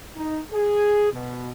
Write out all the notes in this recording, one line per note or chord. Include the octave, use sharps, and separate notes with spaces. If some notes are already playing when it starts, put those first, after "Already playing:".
D#4
G#4
B2